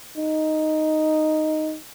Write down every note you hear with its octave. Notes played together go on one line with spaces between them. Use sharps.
D#4